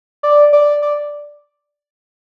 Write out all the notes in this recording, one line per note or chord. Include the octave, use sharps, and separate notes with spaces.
D5
D5
D5